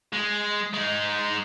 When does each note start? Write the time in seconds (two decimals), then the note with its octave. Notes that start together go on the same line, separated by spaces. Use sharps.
0.13 G#3
0.74 G#3 D#4